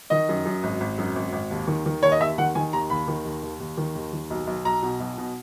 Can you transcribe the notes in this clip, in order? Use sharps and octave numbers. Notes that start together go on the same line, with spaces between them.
D#3 D#5
F#2
F#2
G#1
G#1
F#2
G#1
G#1
D#2
D#3
D#3
D#2 C#5
D#5
D#2 E5
D#3 F#5
D#3 G#5
D#2 A#5
D#2 B5
D#3
D#2
D#2
D#2
D#3
D#2
D#3
B1
B1
B1 A#5
B2
B1
B2